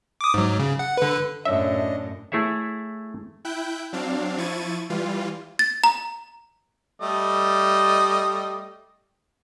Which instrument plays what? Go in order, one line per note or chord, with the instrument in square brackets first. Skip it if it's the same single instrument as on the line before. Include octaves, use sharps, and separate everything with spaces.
[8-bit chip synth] D6 D#6
G#2 F#3
C#3
F#5
D3 B4
[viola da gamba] F#2 A2 [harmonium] D4 D#5 [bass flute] C#5 [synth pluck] E5
[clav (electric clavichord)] A3 E4 G#4 C#5 E5
[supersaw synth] E4 G5 F#6 G6
F#3 C4 D4 F5
F3 E4 C#6 G#6 A6 D#7
E3 G3 F4
[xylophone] A6
A#5
[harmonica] G3 A3 D#5